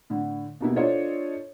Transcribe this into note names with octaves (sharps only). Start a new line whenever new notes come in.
A2 D3
D#2 B2 E4
D4 F4 A4 C5 C#5 D#5